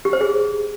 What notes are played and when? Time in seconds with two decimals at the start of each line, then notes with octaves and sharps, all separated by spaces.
0.05 G4
0.13 C5
0.21 G#4